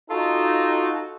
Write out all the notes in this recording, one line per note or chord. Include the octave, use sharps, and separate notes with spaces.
D#4 F4 F#4 A4